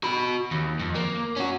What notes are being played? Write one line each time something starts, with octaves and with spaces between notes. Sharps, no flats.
F#4 B5
D#2
F2
A#3
C#4 F#4